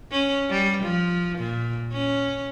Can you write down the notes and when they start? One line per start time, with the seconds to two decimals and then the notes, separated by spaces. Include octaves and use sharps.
0.12 C#4
0.50 G3
0.84 F3
1.39 A#2
1.93 C#4